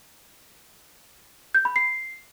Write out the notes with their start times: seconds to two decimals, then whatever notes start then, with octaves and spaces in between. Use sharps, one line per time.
1.54 G6
1.65 B5
1.76 C7